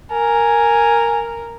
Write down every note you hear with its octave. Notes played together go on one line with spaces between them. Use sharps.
A#4 G#5